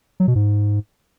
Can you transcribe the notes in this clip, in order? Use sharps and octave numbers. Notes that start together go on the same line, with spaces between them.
F#3
B2
G#2